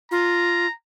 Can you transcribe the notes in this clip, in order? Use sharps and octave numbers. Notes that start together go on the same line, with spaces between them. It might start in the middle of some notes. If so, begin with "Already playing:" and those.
F4 A#5